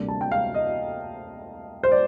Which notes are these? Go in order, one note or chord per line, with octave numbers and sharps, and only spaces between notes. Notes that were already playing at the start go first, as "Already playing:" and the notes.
Already playing: D2 C3 G3 A#3 D4
A5
G5
F5
D#5
C5
D5